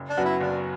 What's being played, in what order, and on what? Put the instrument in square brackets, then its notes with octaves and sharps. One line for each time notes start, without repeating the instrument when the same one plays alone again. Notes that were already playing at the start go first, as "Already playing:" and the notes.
Already playing: [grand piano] F#1
[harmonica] D4
[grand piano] F#2 F#3 B3 F#4
[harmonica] E4
[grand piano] F#1 [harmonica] D4